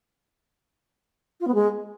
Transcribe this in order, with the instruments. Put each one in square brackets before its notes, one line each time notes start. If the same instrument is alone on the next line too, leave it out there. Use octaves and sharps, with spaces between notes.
[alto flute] F4
B3
G#3